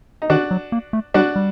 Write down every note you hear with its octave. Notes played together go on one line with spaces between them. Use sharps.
D#4
D#3 D4 F#4
F#3
A#3
A3
G3 D4 F#4
G3